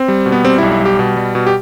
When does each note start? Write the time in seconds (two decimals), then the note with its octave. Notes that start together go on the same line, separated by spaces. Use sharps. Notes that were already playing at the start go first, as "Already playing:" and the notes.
Already playing: C4
0.08 G3
0.26 B2
0.32 B3
0.44 G3 C4
0.58 E4
0.63 B1
0.71 E4
0.80 G3
0.85 G4
0.99 B2
1.17 G3
1.35 B2
1.47 G4